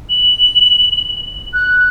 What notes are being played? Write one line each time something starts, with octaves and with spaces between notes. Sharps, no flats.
F#7
F#6